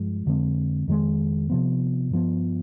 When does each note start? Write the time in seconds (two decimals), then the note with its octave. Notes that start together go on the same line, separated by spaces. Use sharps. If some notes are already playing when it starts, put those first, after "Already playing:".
Already playing: G2 F3 G#3
0.26 F2 D3 G#3 C4
0.88 F2 D#3 G#3
1.50 C3 F3 B3
2.11 G2 F3 B3